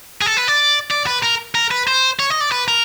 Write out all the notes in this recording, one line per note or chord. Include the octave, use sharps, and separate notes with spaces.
G#4
A4
B4
D5
D5
B4
A#4
A#4
B4
C5
C#5
D#5
D5
B4
A#4